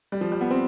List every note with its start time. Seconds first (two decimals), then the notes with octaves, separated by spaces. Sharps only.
0.12 G3
0.21 F3
0.32 G3
0.41 B3
0.51 C4